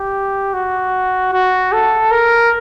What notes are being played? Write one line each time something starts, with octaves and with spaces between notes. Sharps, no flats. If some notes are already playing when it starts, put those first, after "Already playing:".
Already playing: G4
F#4
F#4
A4
A#4